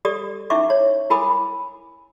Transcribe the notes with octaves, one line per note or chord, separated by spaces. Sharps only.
G4 A4 D5 D#6
C#4 D#4 E4 E5 C#6 D6
C#5
E4 A#4 G#5 B5 D6 D#6